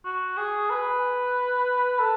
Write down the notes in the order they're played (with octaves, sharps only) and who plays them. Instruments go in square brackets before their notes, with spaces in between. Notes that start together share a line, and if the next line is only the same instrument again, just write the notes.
[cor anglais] F#4
G#4
B4
A4